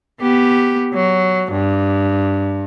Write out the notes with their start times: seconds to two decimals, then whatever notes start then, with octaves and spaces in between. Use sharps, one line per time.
0.21 B3 G4
0.93 F#3
1.52 G2